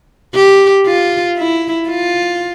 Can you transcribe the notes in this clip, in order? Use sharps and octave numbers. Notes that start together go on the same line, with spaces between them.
G4
F4
E4
F4